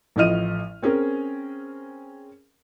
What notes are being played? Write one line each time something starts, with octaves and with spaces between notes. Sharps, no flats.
A1 A2 F3 D#5 F6 D#7
C4 C#4 G#4 A#4